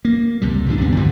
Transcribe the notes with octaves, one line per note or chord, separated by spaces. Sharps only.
A#3
C#2 C3 G3
C#2 G#2 E3 D4
D#2 C3 G3 B3
G2 D3 E3 G3